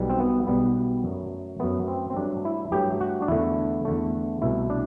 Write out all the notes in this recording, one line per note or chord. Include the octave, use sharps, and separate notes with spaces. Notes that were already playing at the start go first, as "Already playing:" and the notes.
Already playing: B1 B2 G3
C4
B3
B1 B2 G3 B3
F#2 F#3 A3
F#2 F#3 A3 B3
C4
C4
G2 F#3 A3 D4
E4
G2 F#3 A3 G4
F#4
D4
E2 D3 A3 E4
E2 D3 A3
C2 B2 A3 E4
D4